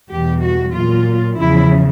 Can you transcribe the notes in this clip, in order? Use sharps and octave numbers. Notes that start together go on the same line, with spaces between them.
E2 B2 G3 G4
F#4
A#2 F#3 F4
E2 C#3 F3 E4